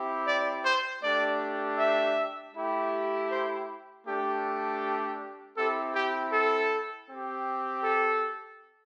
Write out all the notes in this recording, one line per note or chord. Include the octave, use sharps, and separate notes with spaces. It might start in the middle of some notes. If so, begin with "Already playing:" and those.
Already playing: C4 E4 G4
D5
C5
A3 D4 G4 D5
E5
A3 E4 G4
C5
A3 D4 G4
C4 E4 G4 A4
G4
A4
C4 G4
A4